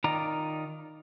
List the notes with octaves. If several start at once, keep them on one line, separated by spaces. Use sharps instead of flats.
D#3 D#4 F4 D5 A#5